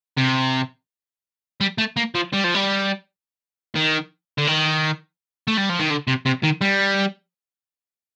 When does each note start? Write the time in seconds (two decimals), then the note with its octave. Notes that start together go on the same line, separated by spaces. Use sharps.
0.17 C3
1.61 G3
1.78 A3
1.97 A#3
2.15 F3
2.33 G3
2.44 F3
2.55 G3
3.75 D#3
4.38 D3
4.47 D#3
5.47 A3
5.57 G3
5.69 F3
5.79 D#3
5.90 D3
6.07 C3
6.26 C3
6.43 D#3
6.61 G3